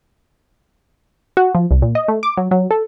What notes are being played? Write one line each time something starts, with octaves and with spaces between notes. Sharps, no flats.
F#4
F3
C2
A#2
D#5
A3
D6
F#3
F#3
A4